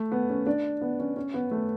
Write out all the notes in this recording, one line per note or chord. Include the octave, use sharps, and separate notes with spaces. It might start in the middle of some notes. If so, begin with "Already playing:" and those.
Already playing: A3
B3
C#4
D4
B3
C#4
C#4
B3
A3